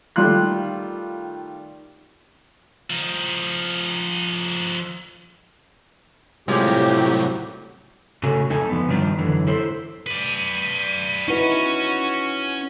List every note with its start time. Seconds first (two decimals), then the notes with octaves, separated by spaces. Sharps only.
0.16 D#3 G3 A3 F4 C6 F#6
2.90 F3 D#4
6.48 C2 A2 F#3 G#3 F4 G4
8.23 A2 C#3 C#4 F#4 A4 G#5
8.50 F2 D#4 A4 G#5
8.70 F3 B3
8.88 G2 D#3 G3 D4 F4 G4
9.19 F#2 D3 E3
9.47 E4 A4 C5
10.07 B4 D5 D#7
11.28 C#4 D#4 E4 F#4 B4